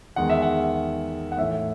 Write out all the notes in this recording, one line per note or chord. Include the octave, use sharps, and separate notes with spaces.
E2 D#3 G#3 F#5
E5
F#5
F#5
A2 E3 A3 E5